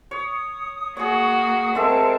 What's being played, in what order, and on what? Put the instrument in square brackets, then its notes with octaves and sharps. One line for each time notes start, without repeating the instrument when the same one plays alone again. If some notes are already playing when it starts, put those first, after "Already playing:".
[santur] C#5 [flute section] D#6
[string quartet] A#3 F#4 [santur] G#4 C#5
[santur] G#3 A4 E5 [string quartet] C4 [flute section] A#4 A5